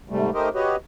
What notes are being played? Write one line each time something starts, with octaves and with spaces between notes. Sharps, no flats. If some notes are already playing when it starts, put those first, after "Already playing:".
G#2 C3 G3 A3
A3 D#4 G4 A#4 C5 D#5
F#4 G4 B4 C#5 D#5